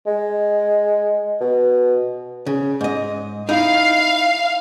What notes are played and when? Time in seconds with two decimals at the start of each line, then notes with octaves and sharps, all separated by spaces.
0.06 G#3
1.40 B2
2.47 C#3
2.81 G#2 D#5
3.49 D#4 E4 F5